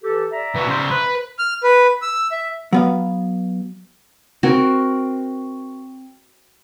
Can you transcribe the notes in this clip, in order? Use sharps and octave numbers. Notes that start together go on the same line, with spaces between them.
E3 G4 A4
D5 E5 A#5
E3 F#4
C#3 C5
B4
F6
B4
E6
E5
F#3 B3 F5
C4 F#4 A#4